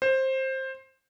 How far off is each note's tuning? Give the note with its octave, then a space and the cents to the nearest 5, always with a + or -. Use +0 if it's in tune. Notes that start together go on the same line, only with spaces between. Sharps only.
C5 +15